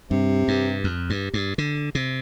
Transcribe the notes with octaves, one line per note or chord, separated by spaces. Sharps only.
G2 C3
G2
F2
G2
G2
D3
C3